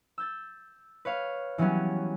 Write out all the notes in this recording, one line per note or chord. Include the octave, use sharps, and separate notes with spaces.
E6 G6 A6
B4 C#5 F5
E3 F#3 G3 B3 C#4